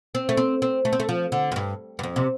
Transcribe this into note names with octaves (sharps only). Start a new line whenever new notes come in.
C4
A3
C4
C4
A3
C4
A3
F3
D3
F2
G2
G2
F2
C3